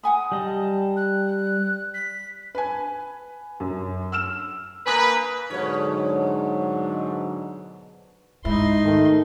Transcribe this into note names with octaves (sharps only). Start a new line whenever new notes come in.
F#5 G#5 B5 D#6
G3 D#5 A5
F#6
B6
B4 G#5
F#2
E6 F6 E7
A#3 B4 G#5 D#6 F#6
G#2 B2 D3 F#3 C#5
G#2 D#4 E4 C6
D#3 A3